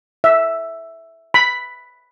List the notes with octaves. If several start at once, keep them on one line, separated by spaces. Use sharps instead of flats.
E5
B5